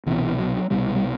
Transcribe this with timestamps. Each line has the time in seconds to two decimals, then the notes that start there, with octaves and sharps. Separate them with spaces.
0.06 C2 B2 E3
0.39 F#3
0.70 C2 B2 G3
0.95 G3